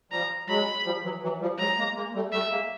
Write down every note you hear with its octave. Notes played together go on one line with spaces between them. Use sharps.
F3 G3 A#5
F#3 G#3 B5
F3 G3
E3 F#3
E3 F#3
F3 G3
F#3 G#3 A#5
G#3 A#3
G#3 A#3
G3 A3
G3 A3 E5
G#3 A#3